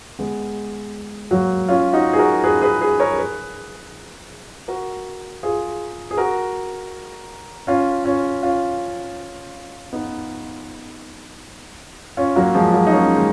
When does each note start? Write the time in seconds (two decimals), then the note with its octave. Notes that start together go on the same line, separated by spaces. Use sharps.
0.19 G#3 B3
1.31 F#3 A#3
1.68 C#4 F4
1.93 D#4 F#4
2.13 G#4
2.18 F#4 A#4
2.44 G#4 B4
2.62 G#4 B4
2.81 G#4 B4
2.99 A#4 C#5
3.18 G#4 B4
4.68 F#4 A#4
5.43 F4 G#4
6.11 G#4
6.17 F#4 A#4
7.67 C#4 F4
8.05 C#4 F4
8.43 C#4 F4
9.93 B3 D#4
12.17 C#4 F4
12.36 F#3 A#3
12.54 F3 G#3
12.73 F#3 A#3
12.87 D#4
12.92 A#3 C#4
13.17 G#3